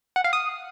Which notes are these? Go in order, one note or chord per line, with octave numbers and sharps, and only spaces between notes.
F#5
F5
D#6